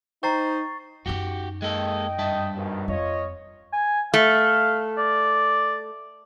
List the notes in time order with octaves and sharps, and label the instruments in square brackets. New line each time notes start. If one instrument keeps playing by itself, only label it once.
[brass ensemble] D#4 [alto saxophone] C5 [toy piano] G5 A#5 [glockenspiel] C#6 A6 C7
[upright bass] F#2 D#4 [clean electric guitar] F#4 G4
[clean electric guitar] G#3 A#3 A4 [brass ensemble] D#5 G5
[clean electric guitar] G2 E5 A5
[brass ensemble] A#1 D#2 B2
[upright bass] F2 [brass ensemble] F4 C#5 D#5
[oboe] G#5
[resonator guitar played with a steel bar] A3 [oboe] F5
[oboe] D5